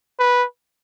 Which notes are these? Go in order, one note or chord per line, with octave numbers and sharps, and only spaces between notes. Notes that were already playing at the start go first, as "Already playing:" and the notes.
B4